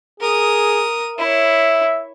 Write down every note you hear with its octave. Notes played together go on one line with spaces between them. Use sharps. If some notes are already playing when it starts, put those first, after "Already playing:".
G#4 A#4 D#6
E4 C#5 E5